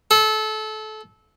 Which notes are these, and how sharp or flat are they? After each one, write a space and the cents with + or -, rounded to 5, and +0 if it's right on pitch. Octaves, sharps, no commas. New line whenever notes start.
A4 -25